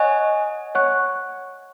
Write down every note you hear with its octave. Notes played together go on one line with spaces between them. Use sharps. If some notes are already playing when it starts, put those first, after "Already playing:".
Already playing: C#5 D#5 F#5 G#5 C#6 F#6
C#5 F#5 C#6 F#6